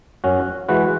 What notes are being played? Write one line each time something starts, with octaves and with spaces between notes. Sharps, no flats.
F#2 C#4 F#4
E3 G#3 F#4 B4